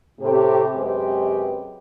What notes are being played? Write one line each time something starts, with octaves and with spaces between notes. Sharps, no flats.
A2 C3 G4
F#2 C3 G#3 C4 G4 B4